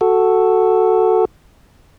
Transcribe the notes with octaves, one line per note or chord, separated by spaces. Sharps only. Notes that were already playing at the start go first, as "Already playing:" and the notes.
F#4 A4